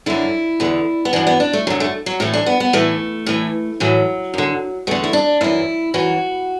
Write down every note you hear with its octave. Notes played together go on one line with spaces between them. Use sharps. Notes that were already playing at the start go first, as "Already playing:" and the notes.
F#2 D3 E4
E2 D3
B3
F#2 E3 D4
B3
D4
A3
F#2 D3 F#3
A3
F#3
A2 E3 A3
D4
B3
B3
A2 E3 A3
A2 E3
A2 E3 F#3
F#2 D3
E2 D3 A3
E4
D4
F#2 E3 E4
F#2 E3 F#4